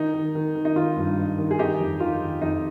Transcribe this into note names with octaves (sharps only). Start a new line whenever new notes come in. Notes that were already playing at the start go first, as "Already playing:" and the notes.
Already playing: D#3 D#4
D#3
D#3
D#3
D#4
D#3 F4
G2
G2
D#3
G#4
D#3 D#4 G4
F2
D#3 F4
F2
F2 D#4